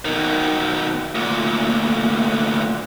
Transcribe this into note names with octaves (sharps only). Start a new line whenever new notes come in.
B2 D#3
D2 A#2